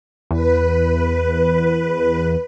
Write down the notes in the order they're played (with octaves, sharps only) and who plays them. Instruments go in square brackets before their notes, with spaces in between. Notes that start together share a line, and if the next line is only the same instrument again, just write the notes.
[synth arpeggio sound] E2 [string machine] B4